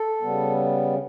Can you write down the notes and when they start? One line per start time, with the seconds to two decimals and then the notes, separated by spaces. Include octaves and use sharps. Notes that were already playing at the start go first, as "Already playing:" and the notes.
Already playing: A4
0.22 C#3 G3 B3